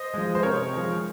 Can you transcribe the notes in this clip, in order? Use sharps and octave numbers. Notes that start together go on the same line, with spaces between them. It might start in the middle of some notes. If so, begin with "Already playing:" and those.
Already playing: C5 D#5
F3 G#3
C5
C3 A#4 C#5
F3 G#3